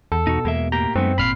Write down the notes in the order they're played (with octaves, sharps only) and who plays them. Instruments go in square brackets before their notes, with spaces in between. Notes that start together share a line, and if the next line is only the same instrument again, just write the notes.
[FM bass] E2 [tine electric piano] A4
[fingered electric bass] B2 [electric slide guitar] D#4 F#4
[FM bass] E2 [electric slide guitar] G#3 A#3 E5
[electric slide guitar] A2 A#3 G4 [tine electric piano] A#5
[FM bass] F#2 [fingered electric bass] G#3 [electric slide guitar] A3 B3 D#4 [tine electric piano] C4
[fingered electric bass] G#1 A#2 [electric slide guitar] C4 [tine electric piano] B5 F6 C7